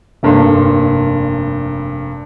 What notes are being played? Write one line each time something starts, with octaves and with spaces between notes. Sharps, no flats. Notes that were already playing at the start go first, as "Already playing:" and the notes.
F1 G2 A#3 C6